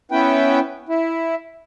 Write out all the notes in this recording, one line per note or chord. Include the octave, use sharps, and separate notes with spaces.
B3 C#4 E4 B4 G5
E4